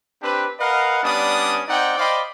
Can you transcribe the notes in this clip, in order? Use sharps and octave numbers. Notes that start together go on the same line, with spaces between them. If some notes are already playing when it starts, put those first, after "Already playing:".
C4 D4 G4 B4
A#4 B4 D#5 F5 F#5
G3 B3 C#4 D4 D5 D#6
C4 D#4 D5 F#5 G5
C5 D5 D#5 F5 G5 B5